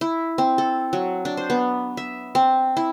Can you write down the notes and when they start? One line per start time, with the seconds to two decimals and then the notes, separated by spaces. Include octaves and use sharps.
0.01 E4
0.38 C4
0.58 A4
0.93 F#3
1.25 D4
1.37 C5
1.50 B3
1.97 E5
2.35 C4
2.77 E4